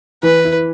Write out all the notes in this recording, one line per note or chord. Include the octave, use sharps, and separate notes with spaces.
E3 B4
E4